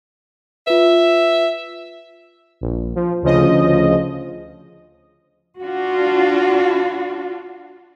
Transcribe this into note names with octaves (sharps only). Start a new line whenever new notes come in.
F4 B4 E5
A#1
F3
D2 C#3 F3 D#5
D4 F4 F#4